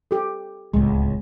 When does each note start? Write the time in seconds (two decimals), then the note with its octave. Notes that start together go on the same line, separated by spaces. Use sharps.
0.11 G4 A4
0.74 D1 C#2 G#3